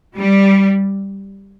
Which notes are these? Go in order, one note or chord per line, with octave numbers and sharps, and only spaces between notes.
G3